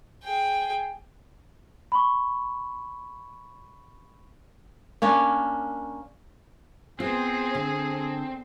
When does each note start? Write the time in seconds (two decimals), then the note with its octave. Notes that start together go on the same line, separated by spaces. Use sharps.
0.24 G#4 G5
1.92 B5 C#6
5.02 A#3 C#4 D4
7.00 B3 C4 F4 G#4
7.55 D3